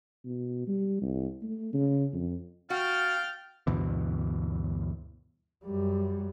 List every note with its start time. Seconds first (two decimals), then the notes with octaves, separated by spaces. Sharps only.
0.25 B2
0.68 G3
1.02 C2
1.42 A3
1.74 C#3
2.13 F2
2.70 F#4 F5 G5 F6 A6
3.67 D2 G2 B2 E3
5.65 F#2 G3